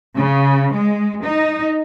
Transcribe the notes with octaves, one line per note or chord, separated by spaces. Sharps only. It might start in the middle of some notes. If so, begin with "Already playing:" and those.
C#3
G#3
D#4